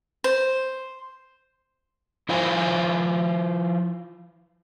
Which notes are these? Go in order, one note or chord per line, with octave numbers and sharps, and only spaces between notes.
C5
F3 E4 F4 C5 G#5